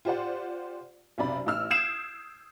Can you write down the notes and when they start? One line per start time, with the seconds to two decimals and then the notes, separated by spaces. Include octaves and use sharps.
0.05 F4 G4 C5 D5 F#5
1.18 B1 F#2 C3 D5 B5
1.46 A1 D#4 E6 F6
1.70 D#6 G6 G#6 C7 D7 E7